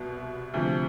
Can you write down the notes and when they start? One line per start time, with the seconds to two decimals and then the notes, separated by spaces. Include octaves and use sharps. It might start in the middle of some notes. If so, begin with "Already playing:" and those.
Already playing: C2 B2 B3
0.54 D2 C3 F3